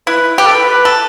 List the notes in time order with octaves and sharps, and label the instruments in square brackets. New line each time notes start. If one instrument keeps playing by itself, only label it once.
[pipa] E4 [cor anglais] B4
[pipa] G4 [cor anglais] B4
[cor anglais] A4
B4
B4
[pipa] A4